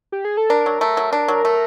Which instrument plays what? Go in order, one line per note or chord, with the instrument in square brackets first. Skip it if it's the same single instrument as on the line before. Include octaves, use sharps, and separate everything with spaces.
[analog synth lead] G4
G#4
A4
[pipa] D4 [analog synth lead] A#4
[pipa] F#3
A3
F#3
D4
F#3
A3